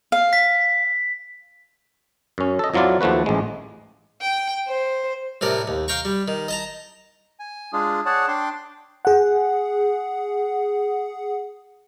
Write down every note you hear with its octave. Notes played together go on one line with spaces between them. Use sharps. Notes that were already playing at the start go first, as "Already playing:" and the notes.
F5
B6
F#2 C#4
A4 D#5
F2 F3 F#3 E4 F4 D5
D#2 F3 A3 F#4 B4
A1 G#3
G5
C5
A2 C3 A#4 D5
D#2
F5 G5 A#5 C#6
G3
D#3
D#5 A5 A#5
G#5
G#3 D4 F4 G#4
G#4 C#5 D5 F#5 A5
D4 G5 C6 D6
G#4 F#5